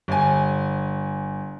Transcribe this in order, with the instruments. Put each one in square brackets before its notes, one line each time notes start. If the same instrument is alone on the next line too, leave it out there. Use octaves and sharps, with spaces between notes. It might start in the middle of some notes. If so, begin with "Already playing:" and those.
[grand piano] G1 G#5